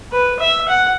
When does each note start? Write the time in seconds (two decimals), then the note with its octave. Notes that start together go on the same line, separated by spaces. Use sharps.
0.12 B4
0.40 E5
0.68 F#5